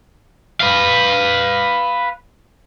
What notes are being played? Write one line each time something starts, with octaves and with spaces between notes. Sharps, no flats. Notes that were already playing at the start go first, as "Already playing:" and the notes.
B4 F5